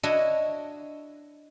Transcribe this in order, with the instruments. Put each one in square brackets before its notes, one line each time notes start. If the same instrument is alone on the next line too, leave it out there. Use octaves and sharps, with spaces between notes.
[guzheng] D4 E4 F#4 C#5 D#5